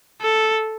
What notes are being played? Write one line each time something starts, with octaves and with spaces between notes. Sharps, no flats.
A4